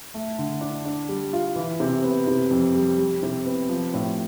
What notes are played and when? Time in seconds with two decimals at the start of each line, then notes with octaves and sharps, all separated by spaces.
0.14 A3
0.38 D3
0.61 D4
0.85 D4
1.09 G3
1.33 F4
1.56 E3
1.80 C3
2.04 B3
2.27 C3
2.51 F2
2.75 G3
2.98 G3
3.23 C3
3.45 B3
3.69 F3
3.94 A2